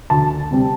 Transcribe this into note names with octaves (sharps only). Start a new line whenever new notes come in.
D2 A5
C3 G3 C4